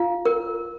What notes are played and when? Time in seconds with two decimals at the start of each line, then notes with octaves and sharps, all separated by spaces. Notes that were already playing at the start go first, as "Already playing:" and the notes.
Already playing: F4 F5
0.25 A#4